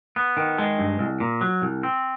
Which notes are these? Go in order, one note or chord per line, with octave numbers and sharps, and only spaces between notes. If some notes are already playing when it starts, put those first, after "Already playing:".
B3
D#3
G#3
G2
C2
A#2
F#3
C2
C4